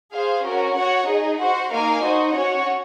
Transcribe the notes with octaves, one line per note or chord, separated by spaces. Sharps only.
G#4 C5 F5
C#4 F#4 A#4
F#4 C#5 F#5
D#4 G#4 D#5
F#4 C5 F#5
A#3 D#4 A#4 F5 G#5
D#4 F#4 C5 D#5
C#4 F#4 C#5 F#5